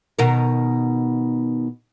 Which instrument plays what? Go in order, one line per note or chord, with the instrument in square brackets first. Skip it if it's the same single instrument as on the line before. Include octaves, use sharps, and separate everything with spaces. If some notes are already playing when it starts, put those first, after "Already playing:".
[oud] B2 D#3 A#4